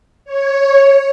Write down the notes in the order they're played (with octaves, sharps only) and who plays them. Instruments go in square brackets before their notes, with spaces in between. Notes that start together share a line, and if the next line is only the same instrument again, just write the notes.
[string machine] C#5